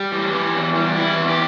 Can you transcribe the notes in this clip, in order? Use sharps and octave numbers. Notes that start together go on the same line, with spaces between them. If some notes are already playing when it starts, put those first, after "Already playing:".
Already playing: G3 G4
E3
E3
E2
G3
E3 E4
E2
G4